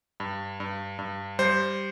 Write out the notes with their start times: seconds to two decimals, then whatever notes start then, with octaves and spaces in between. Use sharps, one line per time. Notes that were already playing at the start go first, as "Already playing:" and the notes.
0.20 G2
0.60 G2
0.99 G2
1.39 G3 C5